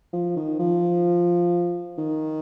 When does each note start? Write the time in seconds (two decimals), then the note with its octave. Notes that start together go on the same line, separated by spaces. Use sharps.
0.13 F3
0.36 D#3
0.59 F3
1.98 D#3